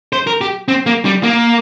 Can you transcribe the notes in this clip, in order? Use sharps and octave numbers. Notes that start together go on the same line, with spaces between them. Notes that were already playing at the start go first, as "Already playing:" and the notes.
C5
A#4
G4
C4
A#3
G3
A#3